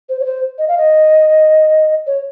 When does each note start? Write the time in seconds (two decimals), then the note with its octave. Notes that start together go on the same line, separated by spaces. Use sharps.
0.09 C5
0.20 C#5
0.25 C5
0.58 D#5
0.68 F5
0.78 D#5
2.07 C#5